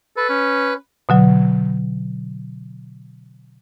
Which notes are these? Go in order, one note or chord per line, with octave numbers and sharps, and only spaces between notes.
A4 B4
C#4
B2 D3 F#3